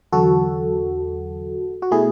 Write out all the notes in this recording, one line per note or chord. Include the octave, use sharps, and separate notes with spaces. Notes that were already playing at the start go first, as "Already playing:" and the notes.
E2 D3 F#3 F#4 A4
F#4
B2 A3 E4 G#4